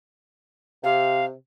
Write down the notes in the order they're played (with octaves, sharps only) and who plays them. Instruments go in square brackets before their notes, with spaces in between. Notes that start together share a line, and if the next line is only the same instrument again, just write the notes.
[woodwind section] C3 [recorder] F5